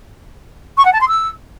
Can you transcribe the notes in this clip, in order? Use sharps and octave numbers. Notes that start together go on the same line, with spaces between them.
C#6
F#5
A5
C6
E6